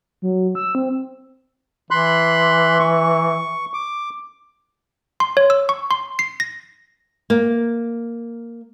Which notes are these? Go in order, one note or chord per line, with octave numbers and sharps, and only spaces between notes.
F#3
E6
C4
E3 B5 C6 F#6
C#6
D6
C6
C#5
E6
C#6
C6
C7
A#6
A#3